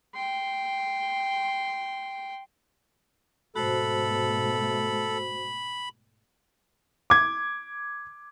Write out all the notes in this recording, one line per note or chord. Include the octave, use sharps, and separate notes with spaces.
G5 C6
G#2 B2 A3 F#4 A4 C5 B5
D6 G#6